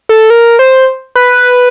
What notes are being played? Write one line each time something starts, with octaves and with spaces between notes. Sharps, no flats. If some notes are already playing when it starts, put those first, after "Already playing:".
A4
A#4
C5
B4